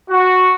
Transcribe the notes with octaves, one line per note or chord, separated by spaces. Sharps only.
F#4